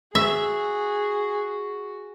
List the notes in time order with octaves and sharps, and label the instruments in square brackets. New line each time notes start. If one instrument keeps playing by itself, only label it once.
[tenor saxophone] F#4 [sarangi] G#4 [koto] E5